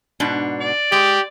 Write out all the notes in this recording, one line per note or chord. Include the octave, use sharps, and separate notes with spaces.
G#2 B2 D4
D5
G#3 G4